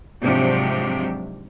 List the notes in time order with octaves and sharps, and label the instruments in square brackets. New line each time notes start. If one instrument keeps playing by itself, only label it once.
[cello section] G#2 C3 F3 F#3 D4 G4